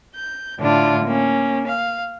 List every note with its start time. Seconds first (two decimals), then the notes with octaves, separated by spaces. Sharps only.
0.15 G6
0.60 A2 D3 D4 E4 F4
1.05 A#3 C#4
1.67 F5